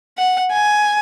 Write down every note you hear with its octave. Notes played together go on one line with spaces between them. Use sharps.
F#5
G#5